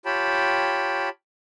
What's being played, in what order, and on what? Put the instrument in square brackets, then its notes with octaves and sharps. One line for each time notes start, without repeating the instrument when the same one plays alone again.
[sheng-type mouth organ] F4 G4 C#5 G5 A5 B5